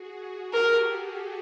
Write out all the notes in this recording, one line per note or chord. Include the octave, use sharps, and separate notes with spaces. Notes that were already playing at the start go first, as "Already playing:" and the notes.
Already playing: F#4 G#4
G4 A4 A#4